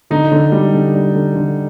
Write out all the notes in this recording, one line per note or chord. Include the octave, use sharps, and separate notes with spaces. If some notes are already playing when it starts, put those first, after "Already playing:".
D3 D#4
D3
G3
D3
G3
D3
D3